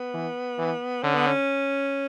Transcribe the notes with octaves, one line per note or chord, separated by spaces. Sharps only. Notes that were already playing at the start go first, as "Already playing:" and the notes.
Already playing: B3
E3
E3
D3 C#4
B3
C#4